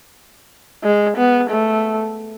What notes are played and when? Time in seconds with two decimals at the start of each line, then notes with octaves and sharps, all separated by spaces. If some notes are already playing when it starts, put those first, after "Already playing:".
0.83 G#3
1.17 B3
1.50 A3